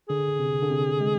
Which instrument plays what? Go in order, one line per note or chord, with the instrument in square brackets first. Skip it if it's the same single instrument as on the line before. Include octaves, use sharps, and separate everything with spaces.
[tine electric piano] D3 [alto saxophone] G#4
[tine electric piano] C3
D3
C3
G#3